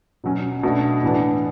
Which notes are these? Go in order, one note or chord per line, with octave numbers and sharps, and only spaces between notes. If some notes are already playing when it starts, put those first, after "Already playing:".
B2 F#3 C#4
B2 A3 D4 F#4
A2 E3 B3 D4